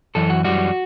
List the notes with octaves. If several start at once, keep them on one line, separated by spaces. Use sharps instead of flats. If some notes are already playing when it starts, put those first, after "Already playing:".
F#2 E3 A4
F#4
F#2 E3 G3 F#4